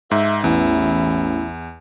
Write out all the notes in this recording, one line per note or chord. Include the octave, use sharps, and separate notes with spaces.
G#2 E5
A1 E2 E4